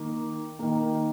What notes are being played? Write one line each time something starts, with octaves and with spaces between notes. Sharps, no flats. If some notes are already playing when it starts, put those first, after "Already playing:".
Already playing: D#3 A#3
D#3 A#3